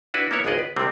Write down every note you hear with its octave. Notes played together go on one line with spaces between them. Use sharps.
D4 E4 F#4 B4
A#3 B3 E4 C#5
G#1 C#2 B3 G#4 D5 D#5
B4
C2 C3 G3 A3 C4